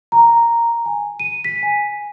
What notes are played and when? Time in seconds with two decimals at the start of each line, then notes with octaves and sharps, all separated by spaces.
0.12 A#5
0.86 G#5
1.20 D#7
1.44 B6
1.63 G#5